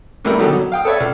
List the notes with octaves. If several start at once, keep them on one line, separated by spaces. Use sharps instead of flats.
G#2 G3 A3 E4 A#4
B2 D3 D#3 F#3 G4 A4
F#3
F5 G5 D#6
A4 B4 C#5 D5 E5
C#2 A4